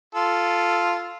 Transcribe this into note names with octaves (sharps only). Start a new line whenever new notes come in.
F4 A4